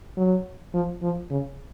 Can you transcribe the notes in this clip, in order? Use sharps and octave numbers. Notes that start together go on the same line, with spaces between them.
F#3
F3
F3
C#3